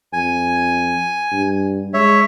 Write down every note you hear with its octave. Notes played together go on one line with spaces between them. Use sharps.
F2 G#5
G2
G#3 C#5 E5